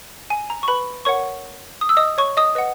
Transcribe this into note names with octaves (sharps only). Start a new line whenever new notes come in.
G#5
A#5
C#6
B4 B5
A#4 C#5 F#5 C#6
D#6
E6
D#5 D#6
C#5 C#6
D#5 D#6
B4 D#5 F#5